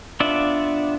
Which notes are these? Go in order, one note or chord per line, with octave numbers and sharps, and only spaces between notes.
B3 D4 F4 D5 E5